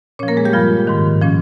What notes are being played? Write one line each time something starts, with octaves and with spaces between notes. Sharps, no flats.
A#2 F3 C#4 C#5
A#3 A#4
G#3 G#4
G3 G4
G2 F3 F4
G#2 D#3
A#2 F3 C#4